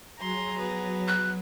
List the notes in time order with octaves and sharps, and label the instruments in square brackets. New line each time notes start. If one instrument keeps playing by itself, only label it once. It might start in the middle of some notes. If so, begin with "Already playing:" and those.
[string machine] F#3 [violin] G#4 A#5 [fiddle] C6
[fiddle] B3
[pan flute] F#6